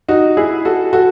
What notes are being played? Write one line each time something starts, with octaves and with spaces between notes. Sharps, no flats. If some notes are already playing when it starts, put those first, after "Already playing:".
D#4 F#4
E4 G#4
F#4 A4
F#4 A4